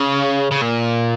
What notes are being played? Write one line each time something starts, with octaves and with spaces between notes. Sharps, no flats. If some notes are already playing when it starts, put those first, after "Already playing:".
Already playing: C#3
C#3
A#2